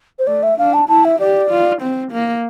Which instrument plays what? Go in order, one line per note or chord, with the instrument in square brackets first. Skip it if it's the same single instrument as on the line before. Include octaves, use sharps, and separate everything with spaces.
[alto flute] C5
[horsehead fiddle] A3 [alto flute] D5
[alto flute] E5
[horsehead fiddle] D4 [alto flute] F5
[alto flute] A5
[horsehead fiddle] E4 [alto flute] A5
[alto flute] E5
[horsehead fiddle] G4 [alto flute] D5
[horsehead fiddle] F4
C4
A#3